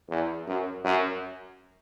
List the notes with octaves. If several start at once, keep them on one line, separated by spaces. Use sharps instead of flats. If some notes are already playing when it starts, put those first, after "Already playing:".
E2
F#2
F#2